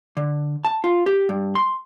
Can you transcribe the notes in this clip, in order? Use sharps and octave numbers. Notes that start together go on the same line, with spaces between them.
D3
A5
F4
G4
G2
C6